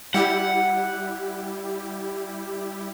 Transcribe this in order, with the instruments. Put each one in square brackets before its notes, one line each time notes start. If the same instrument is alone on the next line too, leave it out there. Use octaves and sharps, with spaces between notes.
[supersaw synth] G3 E4 G4 [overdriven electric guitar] F#5